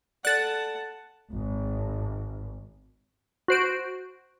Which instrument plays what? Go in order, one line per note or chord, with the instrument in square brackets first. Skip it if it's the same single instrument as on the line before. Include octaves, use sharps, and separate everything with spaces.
[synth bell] A4 D5 [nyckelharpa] F#5 A5 [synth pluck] F#6 A6
[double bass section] G#1
[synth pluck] F#4 C5 D7